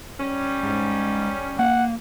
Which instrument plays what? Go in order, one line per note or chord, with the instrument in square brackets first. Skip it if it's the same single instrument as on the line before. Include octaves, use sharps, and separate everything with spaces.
[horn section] G3 C#4
[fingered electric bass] G#2
[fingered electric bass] A#3 [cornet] F#5